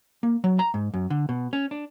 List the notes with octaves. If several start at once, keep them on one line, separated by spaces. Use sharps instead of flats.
A#3
F#3
A#5
G#2
F#2
D3
B2
C#4
D4